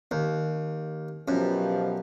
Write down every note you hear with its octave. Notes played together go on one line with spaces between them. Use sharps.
D#2
F#2 B2 F3 G4